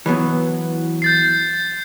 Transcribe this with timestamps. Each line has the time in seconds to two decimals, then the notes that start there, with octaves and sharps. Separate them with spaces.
0.06 E3 F#3 B3
1.02 G6 A6 C7